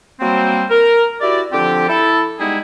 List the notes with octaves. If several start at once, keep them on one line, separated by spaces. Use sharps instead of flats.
F#3 G3 A#3 C4
A#4
E4 F#4 G4 D5
D3 F3 C4 F4 G4
E4 A4
G3 G#3 B3 D#4 E4 G#4